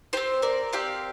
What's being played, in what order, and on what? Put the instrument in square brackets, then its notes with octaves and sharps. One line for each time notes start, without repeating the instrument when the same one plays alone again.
[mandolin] C4 G4 C5
A#4 D5
C4 G4 D5 F5